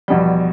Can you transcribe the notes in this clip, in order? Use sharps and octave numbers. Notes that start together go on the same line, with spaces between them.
E2 B2 F3 G3